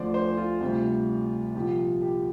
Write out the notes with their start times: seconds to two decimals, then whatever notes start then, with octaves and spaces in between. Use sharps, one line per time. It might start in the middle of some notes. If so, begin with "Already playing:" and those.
Already playing: D2 D3 F3 C5 D5
0.14 C5
0.37 F4
0.61 D2 C3 G3
1.55 C2 A#2 F3 G4
2.02 G4